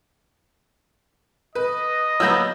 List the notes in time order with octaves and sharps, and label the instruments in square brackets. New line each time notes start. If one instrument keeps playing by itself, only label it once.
[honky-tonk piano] B4 [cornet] D#5
[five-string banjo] F#3 A#3 B3 [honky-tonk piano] E6 G6 A#6